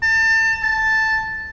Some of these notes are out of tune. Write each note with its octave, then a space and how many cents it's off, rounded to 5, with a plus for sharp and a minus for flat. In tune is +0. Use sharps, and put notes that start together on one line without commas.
A5 +30
A5 +0